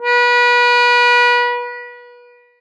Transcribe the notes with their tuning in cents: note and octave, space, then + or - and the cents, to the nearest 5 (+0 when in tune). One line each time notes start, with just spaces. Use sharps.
B4 -30